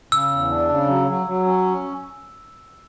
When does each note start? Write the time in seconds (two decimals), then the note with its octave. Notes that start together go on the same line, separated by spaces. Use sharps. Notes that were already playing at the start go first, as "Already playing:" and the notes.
0.12 C#3 E6
0.31 E2
0.50 D4
0.69 C#3
0.88 F#3
1.07 F#3
1.26 F#3
1.46 C#4